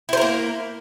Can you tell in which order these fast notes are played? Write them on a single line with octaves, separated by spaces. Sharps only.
E4 C5 A#4 A#3